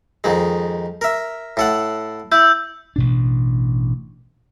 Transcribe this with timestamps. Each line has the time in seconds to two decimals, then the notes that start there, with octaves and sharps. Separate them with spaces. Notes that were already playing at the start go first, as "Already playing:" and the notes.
0.24 F2 D#3 G#3
1.01 A#4 E5
1.57 A2 A4 F#5
2.32 E4 E6 G6
2.96 A1 B2 D4